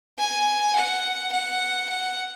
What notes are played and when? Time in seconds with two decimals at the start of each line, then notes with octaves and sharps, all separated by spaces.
0.18 G#5
0.76 F#5
1.32 F#5
1.89 F#5